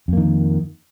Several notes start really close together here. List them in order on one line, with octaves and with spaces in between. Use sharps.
F2 A#3 D#3